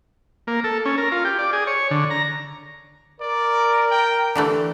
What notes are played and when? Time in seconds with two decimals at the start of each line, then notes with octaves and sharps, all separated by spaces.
0.47 A#3
0.64 A4
0.85 C#4
0.98 A#4
1.12 F4
1.25 G4
1.38 D5
1.53 G#4
1.67 C#5
1.91 D3
2.10 A#5
3.21 A#4 D5
3.91 G5
4.35 D3 E3 A3 G4